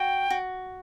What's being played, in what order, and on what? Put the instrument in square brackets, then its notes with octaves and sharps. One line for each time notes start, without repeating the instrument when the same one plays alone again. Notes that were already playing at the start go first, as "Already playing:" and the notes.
Already playing: [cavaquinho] F#4 [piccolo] G5
[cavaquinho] F#4